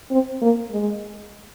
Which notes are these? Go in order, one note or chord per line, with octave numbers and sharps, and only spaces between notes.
C4
A#3
G#3